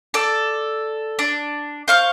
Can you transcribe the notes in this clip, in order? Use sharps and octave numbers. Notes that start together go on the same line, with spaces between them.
A4 D5
D4
C5 F5 C#6